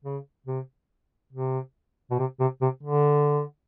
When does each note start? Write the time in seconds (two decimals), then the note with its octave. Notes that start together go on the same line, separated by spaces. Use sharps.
0.04 C#3
0.46 C3
1.33 C3
2.11 B2
2.19 C3
2.40 C3
2.61 C3
2.83 D3